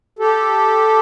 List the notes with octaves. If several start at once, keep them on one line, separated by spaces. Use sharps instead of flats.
G4 A4